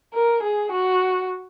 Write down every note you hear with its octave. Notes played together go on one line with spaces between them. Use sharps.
A#4
G#4
F#4